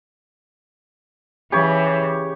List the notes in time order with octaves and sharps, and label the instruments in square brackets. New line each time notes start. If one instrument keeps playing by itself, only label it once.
[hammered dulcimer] C#3 [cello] E3 [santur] G4 C#5